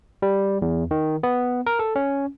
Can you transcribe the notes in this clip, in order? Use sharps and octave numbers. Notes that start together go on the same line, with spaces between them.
G3
E2
D#3
B3
A#4
A4
C#4